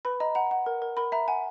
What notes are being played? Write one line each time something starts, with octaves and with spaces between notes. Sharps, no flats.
B4 B5
D#5 A#5
F#5 A#5
F#5
A#4
A#4
A#4 B5
E5 A#5
F#5 G#5